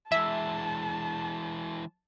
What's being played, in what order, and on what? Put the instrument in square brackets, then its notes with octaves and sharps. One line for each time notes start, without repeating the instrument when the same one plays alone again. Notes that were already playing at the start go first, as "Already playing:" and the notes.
[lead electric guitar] E3 G#3 [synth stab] E5 [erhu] A5